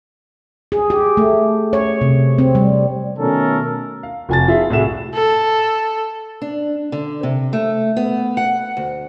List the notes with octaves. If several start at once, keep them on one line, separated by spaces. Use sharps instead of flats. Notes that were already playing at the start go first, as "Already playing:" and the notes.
G#4
G4
A3
C#5
C3
C4
G3
B2 D#3 A3 C#4 A4 A#4
F5
F1 F4 G#5 A5 A6
E4 F4 G#4 E5
C2 A2 F#4 G#4 E5 E7
A4
D4
D3
C3
A3
B3
F#5
D2